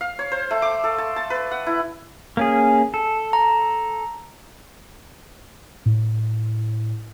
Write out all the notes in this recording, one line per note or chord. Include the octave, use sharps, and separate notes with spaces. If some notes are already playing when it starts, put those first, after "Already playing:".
F5
C#5
C5
A3
D6
A4
A5
A5
B4
F#5
E4
A#3 C#4 G#4
A4
A#5
A2